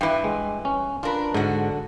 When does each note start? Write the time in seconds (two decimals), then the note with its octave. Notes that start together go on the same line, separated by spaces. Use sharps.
0.01 G2 E3 B4 G5
0.24 G#3
0.65 C#4
1.03 D4 F4 A#4 B4
1.34 G#2 D3 F#4